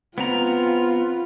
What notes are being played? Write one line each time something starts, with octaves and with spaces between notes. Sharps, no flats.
B3 C4 F4 A#5